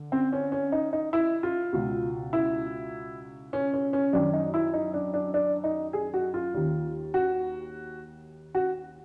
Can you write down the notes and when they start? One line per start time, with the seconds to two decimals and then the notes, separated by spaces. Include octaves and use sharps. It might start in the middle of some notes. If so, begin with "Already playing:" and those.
Already playing: D3
0.12 C4
0.33 C#4
0.52 C#4
0.72 D#4
0.93 D#4
1.13 E4
1.43 F4
1.73 C#2 B2
2.33 E4
3.53 C#4
3.74 C#4
3.93 C#4
4.13 F#2 D#3 D4
4.33 D#4
4.54 E4
4.74 D#4
4.94 D4
5.14 D4
5.34 D4
5.64 D#4
5.93 G#4
6.14 F#4
6.34 F4
6.54 D#2 D#3
7.14 F#4
8.55 F#4